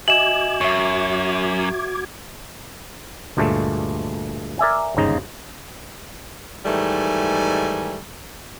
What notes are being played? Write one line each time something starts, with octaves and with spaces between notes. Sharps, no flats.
F#4 D#5 E5 G#5 D6 G#6 E7 F#7
F#2 E5 C#6
D2 G2 A#2 G#3 A3
A#4 D5 E5 G#5
G1 D#2 G#2 C#3 D#4 D#5
G#2 D#3 E3 G3 A3 G#5